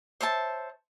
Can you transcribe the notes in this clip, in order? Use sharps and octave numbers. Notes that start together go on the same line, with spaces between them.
C5 C#5 E5 A5